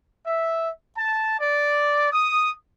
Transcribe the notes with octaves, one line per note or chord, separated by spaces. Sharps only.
E5
A5
D5
D#6